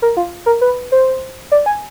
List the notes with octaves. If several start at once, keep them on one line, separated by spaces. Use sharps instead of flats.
A#4
F4
A#4
B4
C5
D5
G#5